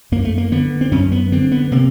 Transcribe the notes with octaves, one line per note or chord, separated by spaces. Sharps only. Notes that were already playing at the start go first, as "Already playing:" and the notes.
F#2 A#3
A3
A#3
D3 B3
C4
F#2 C#4
B3
D3 C4
B3
C3 A#3